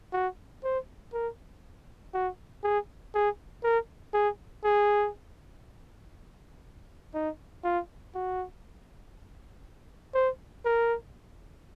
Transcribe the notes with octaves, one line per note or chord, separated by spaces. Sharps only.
F#4
C5
A#4
F#4
G#4
G#4
A#4
G#4
G#4
D#4
F4
F#4
C5
A#4